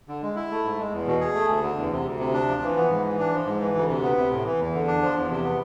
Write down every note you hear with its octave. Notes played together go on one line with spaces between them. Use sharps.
D3
G#3
E4
A3
G#2
G#3
E2
B2
G#4
A3
D2
D3
E2
C3
D2
C3
D4
F3
E3
B3
G#2
E3
D4
F3
G#2
E3
D2
C3
B3
C3
A2
E3
E2
D3
D4
F3
E2
C3
B3